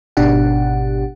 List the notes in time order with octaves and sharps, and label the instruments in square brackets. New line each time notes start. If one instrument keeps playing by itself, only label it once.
[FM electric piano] G#1 B2 D4 G4 F#5